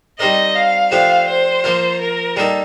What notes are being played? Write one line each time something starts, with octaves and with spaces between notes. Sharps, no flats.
G3 C4 D#4 A#4 D5 D#5
F5
F3 A3 D4 G4 F5
C5
F3 A#3 F4
A#4
G3 A#3 D#4 A4